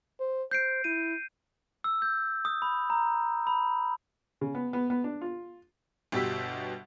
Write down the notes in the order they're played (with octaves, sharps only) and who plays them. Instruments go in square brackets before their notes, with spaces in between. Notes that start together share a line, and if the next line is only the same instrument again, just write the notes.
[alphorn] C5
[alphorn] C5 [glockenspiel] G6 C7 D7
[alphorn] E4 [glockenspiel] D#7
[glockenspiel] E6
G6
D#6
B5
A#5
B5
[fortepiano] C#3
B3
B3
B3
D4
F4
[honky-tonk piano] G1 B2 G4 E6 B6